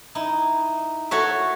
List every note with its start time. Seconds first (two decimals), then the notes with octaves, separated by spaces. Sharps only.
0.15 D#4 E4
1.11 F#4 A4 C#5 E5